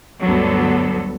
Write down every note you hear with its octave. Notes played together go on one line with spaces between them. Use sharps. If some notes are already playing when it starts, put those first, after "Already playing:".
D2 G2 D3 F#3 B3 A4